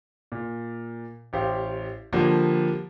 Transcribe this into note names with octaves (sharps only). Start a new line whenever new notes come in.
A#2
A1 G4 C5 F5
D3 F3 G3 A#3